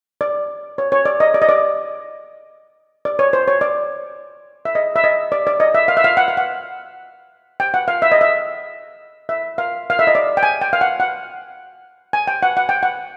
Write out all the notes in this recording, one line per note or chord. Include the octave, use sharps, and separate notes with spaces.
D5
C#5
C#5
D5
D#5
D5
D#5
D5
D5
C#5
C5
C#5
D5
E5
D#5
E5
D#5
D5
D5
D#5
E5
F5
E5
F5
F#5
F5
F#5
G5
F#5
F5
E5
D#5
E5
E5
F5
F5
E5
D#5
D5
G5
G#5
G5
F5
F#5
F#5
G#5
G5
F#5
F#5
G5
F#5